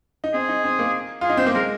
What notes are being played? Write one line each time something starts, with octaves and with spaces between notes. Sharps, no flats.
D#4
C4 G#4
D#4
C4
A#3
F4 G#4
D#4
C4 C5
A#3
G#3 A#4